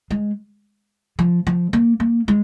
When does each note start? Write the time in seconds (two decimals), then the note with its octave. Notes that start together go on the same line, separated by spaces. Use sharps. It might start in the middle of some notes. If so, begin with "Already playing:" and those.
0.11 G#3
1.19 F3
1.47 F3
1.73 A#3
2.00 A#3
2.28 G#3